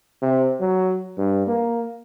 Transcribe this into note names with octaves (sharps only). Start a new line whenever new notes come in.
C3
F#3
G2
A#3